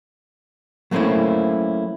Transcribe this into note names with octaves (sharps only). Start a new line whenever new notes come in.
F#3 A3 A#3 C4 C#4 E4